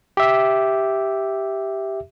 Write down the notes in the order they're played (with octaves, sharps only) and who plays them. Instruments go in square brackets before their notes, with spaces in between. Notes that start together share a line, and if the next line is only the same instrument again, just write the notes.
[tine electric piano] G4 E5